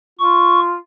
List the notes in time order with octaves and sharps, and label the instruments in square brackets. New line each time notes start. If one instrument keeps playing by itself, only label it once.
[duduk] F4 [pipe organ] C#6